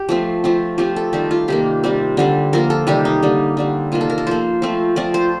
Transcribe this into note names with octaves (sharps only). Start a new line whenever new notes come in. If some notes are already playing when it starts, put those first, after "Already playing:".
Already playing: G4
F3 A3 C4
F3 A3 C4
F3 A3 C4 G4
A4
D#3 G3 C4 G4
F4
C3 D#3 A#3 G4
C3 G3 C4
D3 G3 C4
F3 A#3 A#4
A4
C3 D#3 G3 G4
D#4
D3 G3 A#3
D3 G3 C4
C3 D#3 A#3 F4
A4
A#4
A4
F3 A#3 C5
F3 A3 C4
F3 C4 D5
C5